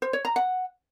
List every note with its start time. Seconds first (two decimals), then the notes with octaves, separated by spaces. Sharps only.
0.02 C5
0.13 C#5
0.25 A#5
0.36 F#5